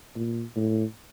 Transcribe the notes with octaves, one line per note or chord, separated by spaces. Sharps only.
A#2
A2